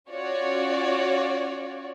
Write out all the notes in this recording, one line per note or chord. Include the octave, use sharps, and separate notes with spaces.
C#4 F4 F#4 C#5 D5